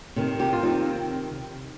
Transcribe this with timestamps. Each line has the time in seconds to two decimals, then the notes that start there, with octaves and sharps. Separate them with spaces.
0.16 C3 D#3
0.39 D#4 G4
0.53 F4
0.63 C4 D#4